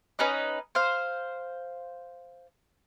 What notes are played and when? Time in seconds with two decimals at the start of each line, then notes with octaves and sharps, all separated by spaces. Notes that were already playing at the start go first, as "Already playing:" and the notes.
0.19 C#4 D#4 B4 D#5
0.75 C5 F5